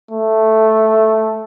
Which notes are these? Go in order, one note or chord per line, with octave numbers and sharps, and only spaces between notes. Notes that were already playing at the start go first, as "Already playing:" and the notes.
A3